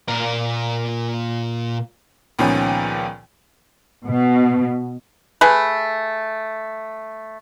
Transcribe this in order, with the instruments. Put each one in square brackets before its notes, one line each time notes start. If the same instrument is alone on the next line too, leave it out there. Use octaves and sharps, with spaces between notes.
[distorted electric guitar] A#2 A#4
[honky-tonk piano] C#2 A#2 D#3 F3 B3 C#4
[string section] B2
[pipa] A3 G#4 B4